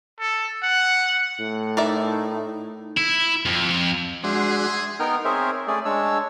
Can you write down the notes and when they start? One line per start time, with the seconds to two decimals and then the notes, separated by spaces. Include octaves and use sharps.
0.20 A4
0.63 F#5
1.40 A2
1.77 D#4 A#4 D5 E5
2.97 E4
3.46 F2
4.24 G#3 D4 F#4 G#4 C5 E5 C6
4.99 B3 D#4 A#4 G5 F6
5.25 C4 G#4 A#4 C5 C#5 E5
5.67 A3 C#4 G#4 D5
5.85 G#3 D4 C#5 E6